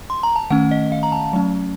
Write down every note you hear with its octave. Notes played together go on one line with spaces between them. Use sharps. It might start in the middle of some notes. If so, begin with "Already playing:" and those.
C6
A#5
A5
D#3 A3 C#4 F#5
D#5
F5
A#5
A5
F#3 A3 C#4